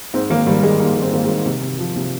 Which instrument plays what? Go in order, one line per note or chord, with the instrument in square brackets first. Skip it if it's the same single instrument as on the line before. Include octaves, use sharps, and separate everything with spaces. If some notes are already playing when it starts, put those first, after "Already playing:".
[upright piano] G#2 C4
G#1 A#3
G#1 G3
G#1 G#3
G#2 A#3
G#1
C4
G#1 A#3
G#3
G#1
C3
C3
F3
C3